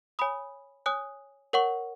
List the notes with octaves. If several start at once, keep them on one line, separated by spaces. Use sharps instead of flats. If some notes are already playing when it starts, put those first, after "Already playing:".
C#5 G#5 B5 D#6
C#5 G#5 D#6 F#6
A#4 C#5 F#5 C#6